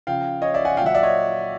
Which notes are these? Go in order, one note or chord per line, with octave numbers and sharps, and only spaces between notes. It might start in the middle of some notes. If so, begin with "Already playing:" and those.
C#3 F3 F5 G5
C#5 D#5
D5 E5
F#5 G#5
A#2 F5 G5
F#3 E5 F#5
D5 E5
C#5 D#5